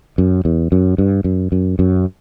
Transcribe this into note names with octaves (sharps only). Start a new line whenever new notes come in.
F#2
E2
F#2
G2
F#2
F#2
F#2